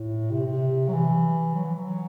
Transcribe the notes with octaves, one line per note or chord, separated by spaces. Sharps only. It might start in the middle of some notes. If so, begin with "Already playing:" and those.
Already playing: A2
C3
C3
F#3
E3
F#3
E3
F#3
F#3